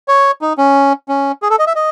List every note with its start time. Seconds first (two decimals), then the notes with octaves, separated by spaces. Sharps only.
0.08 C#5
0.42 D#4
0.58 C#4
1.09 C#4
1.42 G#4
1.50 A4
1.59 D#5
1.67 E5
1.76 D#5